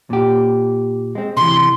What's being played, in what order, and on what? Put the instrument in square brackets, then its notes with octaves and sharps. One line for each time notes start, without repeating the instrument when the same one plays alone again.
[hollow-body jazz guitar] A#2 G4
G#3 C4
[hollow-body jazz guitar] C3 E3 [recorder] C6